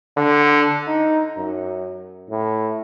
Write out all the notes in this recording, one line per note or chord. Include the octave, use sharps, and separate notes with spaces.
D3
D#4
F#2
A2